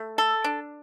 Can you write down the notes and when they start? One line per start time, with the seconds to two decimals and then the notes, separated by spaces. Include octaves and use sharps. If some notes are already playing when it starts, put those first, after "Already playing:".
Already playing: A3
0.18 A4
0.44 D4